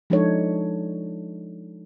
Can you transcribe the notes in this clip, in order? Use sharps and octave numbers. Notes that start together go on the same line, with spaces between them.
F3 G#3 D4 D#4 A4 C#5